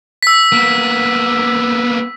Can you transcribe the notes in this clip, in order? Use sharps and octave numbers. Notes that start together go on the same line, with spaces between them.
E6 B6
A#3 B3